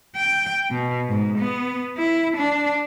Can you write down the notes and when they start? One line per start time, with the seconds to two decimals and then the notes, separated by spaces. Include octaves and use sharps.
0.16 G5
0.71 B2
1.09 G#2
1.38 B3
1.97 E4
2.37 D4